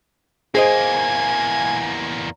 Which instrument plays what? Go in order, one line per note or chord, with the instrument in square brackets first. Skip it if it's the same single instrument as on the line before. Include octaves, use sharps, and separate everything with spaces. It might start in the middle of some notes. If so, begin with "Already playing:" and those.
[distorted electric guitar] E2 A#3 [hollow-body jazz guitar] G#4 C5 D#5 [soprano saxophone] G#5